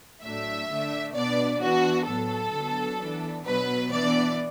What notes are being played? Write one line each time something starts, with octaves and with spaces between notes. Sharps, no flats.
A2 F#3 A3 D4 E5
D3 A3 D4
B2 B3 D4 D5
E3 B3 D4 F#4
A2 F#3 B3 A4
D3 F#3 B3
E3 B3 D4
B2 F#3 B3 B4
E3 B3 D4 D5